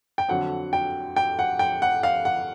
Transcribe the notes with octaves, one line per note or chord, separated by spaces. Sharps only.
G5
F2 D3 F#3 F#5
G5
G5
F#5
G5
F#5
F5
F#5